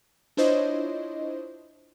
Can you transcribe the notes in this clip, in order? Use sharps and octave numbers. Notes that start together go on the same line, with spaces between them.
D4 E4 F4 C5 C#5 D#5